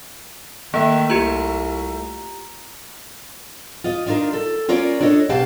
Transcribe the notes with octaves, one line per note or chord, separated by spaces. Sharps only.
D#3 A3 A#3 E5
C2 F4 G4 A#5
F4 D#5
D4 D#4 F4 A4 A#4
A4
C#4 F4 A#4 C#5 D5
D4 A4 C#5 D#5
B2 G4 B4 F5 A5